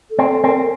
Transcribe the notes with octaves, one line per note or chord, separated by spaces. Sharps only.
A4
C4
A4
C4 A#4